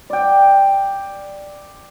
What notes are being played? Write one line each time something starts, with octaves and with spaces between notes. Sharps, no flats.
D5 G5